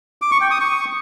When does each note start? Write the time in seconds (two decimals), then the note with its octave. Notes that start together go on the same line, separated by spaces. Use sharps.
0.22 D6
0.31 C#6
0.41 G5
0.51 D#6
0.60 C#6